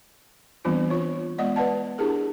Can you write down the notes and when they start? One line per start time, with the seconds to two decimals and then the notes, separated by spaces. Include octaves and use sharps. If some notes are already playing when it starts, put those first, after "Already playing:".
0.65 E3 G3 B3 C4 D4 F4
0.90 F4 C#5
1.38 G#3 B3 D5 D#5 F#5
1.56 B4 D5 F#5 A5
1.98 D4 E4 G4 G#4 A#4